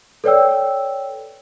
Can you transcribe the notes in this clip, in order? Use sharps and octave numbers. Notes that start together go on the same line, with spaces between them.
A4 B4 C#5 D5 G5 E6